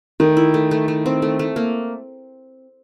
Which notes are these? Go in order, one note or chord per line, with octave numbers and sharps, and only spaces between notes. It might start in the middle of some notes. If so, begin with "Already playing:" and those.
D#3 A3
E4
A3
A3
A3
C4
A3
A3
A#3